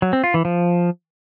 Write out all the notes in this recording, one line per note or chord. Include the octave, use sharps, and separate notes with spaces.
F#3
C4
F4
E3
F3